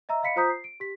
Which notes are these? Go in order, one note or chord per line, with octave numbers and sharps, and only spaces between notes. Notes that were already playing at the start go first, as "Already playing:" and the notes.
D#5 E5 A#5 E6
D#5 F5 B5 B6 C#7
F4 C5 A#5 D#6 G6 B6
C7
D7
G4 B6